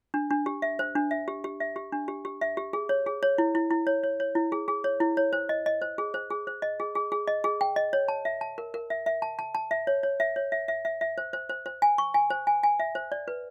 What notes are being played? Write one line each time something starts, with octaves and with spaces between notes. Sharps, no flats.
D4
D4
G4
E5
C5
D4
E5
G4
G4
E5
G4
D4
G4
G4
E5
G4
G#4
C#5
G#4
C#5
E4
E4
E4
C#5
C#5
C#5
E4
G#4
G#4
C#5
E4
C#5
C5
D#5
D#5
C5
G#4
C5
G#4
C5
D#5
G#4
G#4
G#4
D#5
G#4
G5
D#5
C#5
A5
E5
A5
A#4
A#4
E5
E5
A5
A5
A5
E5
C#5
C#5
E5
C#5
E5
E5
E5
E5
C5
C5
C5
C5
G#5
C#6
G#5
C5
G#5
G#5
E5
C5
D5
B4